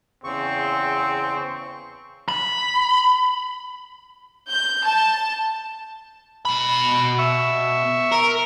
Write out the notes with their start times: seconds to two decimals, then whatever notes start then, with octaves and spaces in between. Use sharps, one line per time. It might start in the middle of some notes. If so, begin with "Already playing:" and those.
0.24 E2 C#3 C4 C#6
2.29 B5
4.49 G6
4.85 A5
6.45 B2 B5
7.19 E5 C#6
8.12 A#4